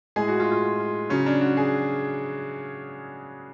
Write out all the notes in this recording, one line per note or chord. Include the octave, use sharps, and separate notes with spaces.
A2 G#3 G#4
F#4
F4
F4
C#3 F#3 C#4
D4
F#4
G#4